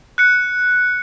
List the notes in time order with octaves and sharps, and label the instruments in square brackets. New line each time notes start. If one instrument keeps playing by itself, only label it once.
[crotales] F#6 C#7